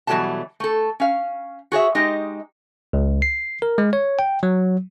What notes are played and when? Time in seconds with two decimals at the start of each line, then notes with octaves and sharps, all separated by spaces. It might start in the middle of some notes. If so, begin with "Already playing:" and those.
0.07 B2 E3 F#3 G3 A3 A5
0.60 A3 A4
1.00 C#4 F5
1.72 F#4 G#4 C#5 E5
1.95 G#3 D#4 G4 D#5
2.93 C#2
3.22 C7
3.62 A#4
3.78 G#3
3.93 C#5
4.19 G5
4.43 F#3